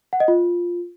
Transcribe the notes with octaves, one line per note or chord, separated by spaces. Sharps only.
F#5
D#5
F4